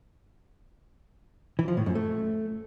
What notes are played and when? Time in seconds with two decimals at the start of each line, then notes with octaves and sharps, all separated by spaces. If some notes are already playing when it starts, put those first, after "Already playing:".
1.59 E3
1.68 F3
1.77 A2
1.86 F#2
1.95 A3